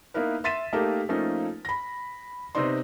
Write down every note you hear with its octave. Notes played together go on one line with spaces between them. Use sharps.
A#3 B3 D#4 E4 A#4 B4
E5 C6 A6 B6 D#7 E7
A3 A#3 D#4 G4 A4 A#4
F3 A3 A#3 C#4 D#4
B5 A#6
C3 B3 C4 D#4 D5 C6